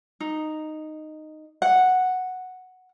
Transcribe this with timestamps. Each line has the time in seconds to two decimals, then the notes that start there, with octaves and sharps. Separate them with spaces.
0.20 D#4
1.62 F#5